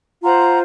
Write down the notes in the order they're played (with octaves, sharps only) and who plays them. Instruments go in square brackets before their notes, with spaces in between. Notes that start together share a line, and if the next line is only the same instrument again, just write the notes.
[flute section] F4 C5 F#5 A#5